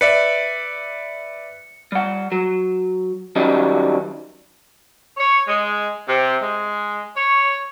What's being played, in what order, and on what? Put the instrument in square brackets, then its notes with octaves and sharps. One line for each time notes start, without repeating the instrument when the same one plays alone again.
[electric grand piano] B4 D5 E5 [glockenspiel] C#7
[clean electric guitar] G3 F#5
F#3
D#3 F#3 G3 C#4 D#4
[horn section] C#5
G#3
C3
G#3
C#5